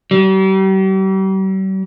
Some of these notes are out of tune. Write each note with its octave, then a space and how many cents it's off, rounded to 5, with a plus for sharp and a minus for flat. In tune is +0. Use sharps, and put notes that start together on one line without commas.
G3 -40